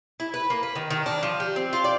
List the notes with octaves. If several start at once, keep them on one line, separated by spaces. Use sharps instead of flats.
E4
B4
A#3
B4
D#3
D#3
D4
F3
G4
C4
F4
D5